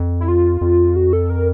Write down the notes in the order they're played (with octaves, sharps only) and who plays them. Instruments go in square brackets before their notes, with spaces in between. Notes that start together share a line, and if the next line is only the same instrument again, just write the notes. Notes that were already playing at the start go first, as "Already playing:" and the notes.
Already playing: [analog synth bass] F2
[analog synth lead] E4
F4
[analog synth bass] F2
[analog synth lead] F#4
A4
A#4